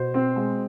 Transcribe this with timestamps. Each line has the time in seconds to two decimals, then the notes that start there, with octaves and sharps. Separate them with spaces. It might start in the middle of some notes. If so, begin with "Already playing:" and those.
Already playing: B2 C5
0.14 C4
0.36 G#3